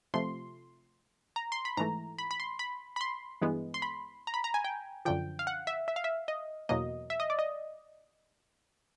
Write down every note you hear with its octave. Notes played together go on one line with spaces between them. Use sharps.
C3 F3 A3 C6
A#5
C6
B5
G#2 E3 A3 A#5
B5
B5
C6
B5
B5
C6
G2 E3 G#3 B3
C6
B5
A#5
B5
A#5
G#5
G5
F#2 D3 F3 G5
F5
F#5
E5
E5
F5
E5
D#5
E2 B2 F#3 A#3 D#5
E5
D#5
D5
D#5